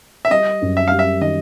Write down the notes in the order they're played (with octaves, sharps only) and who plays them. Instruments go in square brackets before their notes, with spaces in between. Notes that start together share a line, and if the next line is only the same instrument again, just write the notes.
[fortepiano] E5
[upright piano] G3 [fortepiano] D#5
[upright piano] F#2
[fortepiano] E5
[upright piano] G3 [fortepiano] F5
[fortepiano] E5
[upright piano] D#3 [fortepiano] D#5